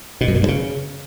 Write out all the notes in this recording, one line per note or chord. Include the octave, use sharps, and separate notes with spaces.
B2
F#2
A#2
G2
C#3